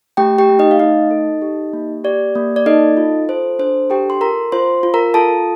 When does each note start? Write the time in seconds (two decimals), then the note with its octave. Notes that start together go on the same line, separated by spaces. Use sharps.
0.17 A3 G4 G5
0.38 G4 G5
0.49 A3
0.59 D#4 D#5
0.71 F5
0.79 A3 D#4 D#5
1.11 A4
1.42 G4
1.73 A#3
2.04 G4 D5
2.35 A#3
2.56 D5
2.66 D#4 A4 D#5
2.97 F4
3.29 A4 C5
3.59 D4 C5
3.90 G4 A4 G5
4.10 C6
4.21 F4 A#4 A#5
4.52 F4 C5 C6
4.83 F4
4.94 A#4 A#5
5.14 F4 A4 A5